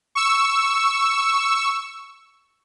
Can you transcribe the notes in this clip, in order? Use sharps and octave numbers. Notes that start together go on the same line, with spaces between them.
C#6 E6